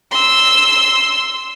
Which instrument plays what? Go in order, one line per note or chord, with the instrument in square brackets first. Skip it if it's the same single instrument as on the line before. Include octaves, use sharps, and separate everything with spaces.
[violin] C6 E6